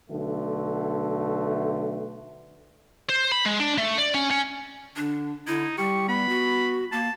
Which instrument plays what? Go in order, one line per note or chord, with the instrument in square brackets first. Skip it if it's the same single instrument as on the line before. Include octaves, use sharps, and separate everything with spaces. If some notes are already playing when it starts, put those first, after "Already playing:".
[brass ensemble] B1 D3 A3
[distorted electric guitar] C5
B5
G#3
D4
A3
D5
C#4
C#4
[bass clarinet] D3 [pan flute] D4
[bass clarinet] D3 [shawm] D#4 [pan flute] E4
[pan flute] G3 [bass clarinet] G4 [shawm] C#6
[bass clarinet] B3 [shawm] B5
[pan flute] F#4
[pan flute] A#3 [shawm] A5